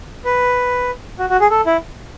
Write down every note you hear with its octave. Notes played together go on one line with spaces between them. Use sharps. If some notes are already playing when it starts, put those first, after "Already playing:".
B4
F#4
F#4
G#4
A4
E4